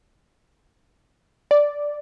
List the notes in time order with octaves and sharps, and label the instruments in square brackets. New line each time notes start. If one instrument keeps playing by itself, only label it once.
[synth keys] D5